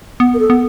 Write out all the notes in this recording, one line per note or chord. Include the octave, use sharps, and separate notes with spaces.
B3
A#4
A4
B3